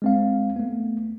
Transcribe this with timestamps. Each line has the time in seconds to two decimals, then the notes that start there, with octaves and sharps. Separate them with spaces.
0.02 G#3 C4 F5
0.56 A3 B3